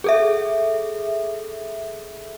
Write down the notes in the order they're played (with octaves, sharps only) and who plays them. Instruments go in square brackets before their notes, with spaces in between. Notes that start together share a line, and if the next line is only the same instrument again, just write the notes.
[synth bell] G#4 A4 E5